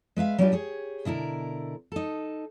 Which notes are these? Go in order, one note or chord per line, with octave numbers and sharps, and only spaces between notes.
G#3 B4 E5 F5
F#3 G3 D4 F4 G4 B4
G4 G#4 C#5
B2 D3 E4 A#4
D#4 A4